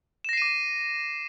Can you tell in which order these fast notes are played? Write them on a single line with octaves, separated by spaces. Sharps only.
E7 A#6 C7 D#7 D6